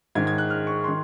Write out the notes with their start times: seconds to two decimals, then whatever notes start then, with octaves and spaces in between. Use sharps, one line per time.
0.15 G#2 D#3 G#6
0.27 G#6
0.38 F#6
0.50 F6
0.67 C#6
0.84 D#3 C6